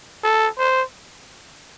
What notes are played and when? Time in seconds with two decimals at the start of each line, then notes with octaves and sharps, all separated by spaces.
0.24 A4
0.58 C5